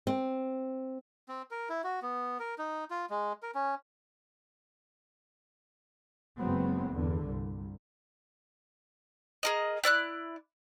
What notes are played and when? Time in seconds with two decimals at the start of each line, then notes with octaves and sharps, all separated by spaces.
0.07 C4
1.28 C4
1.51 A#4
1.69 E4
1.84 F#4
2.02 B3
2.39 A#4
2.58 D#4
2.91 F4
3.10 G#3
3.43 A#4
3.55 C#4
6.38 F#1 F#3 G#3 B3 C4
6.93 E2 G2 D3
7.27 C2
9.43 G#4 A#4 D#5
9.84 E4 D5 F6 F#6